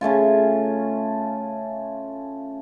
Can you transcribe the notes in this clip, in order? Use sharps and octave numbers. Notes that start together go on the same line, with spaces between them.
C#3 A3 C#4 F4